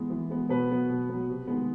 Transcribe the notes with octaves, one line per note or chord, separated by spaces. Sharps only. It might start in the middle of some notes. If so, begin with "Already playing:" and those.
Already playing: E3 G#3 B3
E3
G#3 B3
B2 B3 B4
F#3 B3
B2
F#3 B3
C3
D#3 G#3 B3